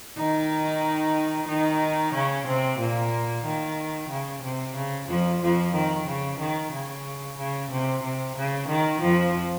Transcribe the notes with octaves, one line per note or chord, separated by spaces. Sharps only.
D#3 D#4
D#3 D#4
C#3 C#4
C3 C4
A#2 A#3
D#3
C#3
C3
C#3
F2 F3
F2 F3
D#3
C#3
D#3
C#3
C#3
C3
C3
C#3
D#3
F2 F3